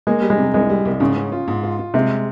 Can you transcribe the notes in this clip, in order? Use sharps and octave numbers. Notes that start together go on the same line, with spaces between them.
G#3 A#3
G3
G#3
C3
C2 G#3
G3
C2
G#2 C#3
C#4
F4
G#2
F4
F4
C3 G#3